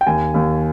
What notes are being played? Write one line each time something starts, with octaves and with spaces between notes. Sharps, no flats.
G5
D#2 G#5
D#2